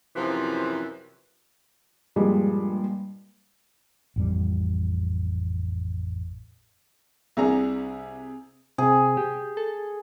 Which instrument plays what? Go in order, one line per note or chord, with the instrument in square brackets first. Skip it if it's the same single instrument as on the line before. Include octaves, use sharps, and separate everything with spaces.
[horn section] F#2 C3 E3 F3
[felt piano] G2 A#2 F3 G3 G#3
[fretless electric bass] A1 F2 G3
[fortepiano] C2 D4 A#5 [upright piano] C3 G#4
[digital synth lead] C3 [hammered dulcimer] G#4
[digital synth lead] G4
A4